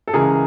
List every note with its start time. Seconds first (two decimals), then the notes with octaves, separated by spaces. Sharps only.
0.08 A4
0.14 C#2 C#3 E3 G#4 A#4